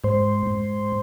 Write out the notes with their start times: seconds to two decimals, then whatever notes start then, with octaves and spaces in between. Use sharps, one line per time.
0.04 G#2 C5
0.47 G#2